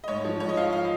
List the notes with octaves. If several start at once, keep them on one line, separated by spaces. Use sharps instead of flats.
D#5
G#2 C#5
F3
G#2 C#5
D#5
F3 F5
F5